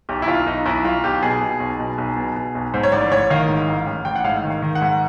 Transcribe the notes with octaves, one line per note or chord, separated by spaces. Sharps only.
B1 G4
E4
B1 F4
B1 D#4
B1 E4
B1 F4
B1 G4
B2 G#4
B2
B1
B2
B1
B2
B2
B1
G#2 C5
C#5
A1 D5
A1 C#5
D#3 F5
G#2
A1
A1
A1 G5
F#5
G#2 F5
D#3
F5
D#3
F#5
G#2